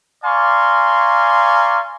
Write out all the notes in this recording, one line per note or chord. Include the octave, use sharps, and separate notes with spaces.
D5 F5 G#5 A#5 C6 C#6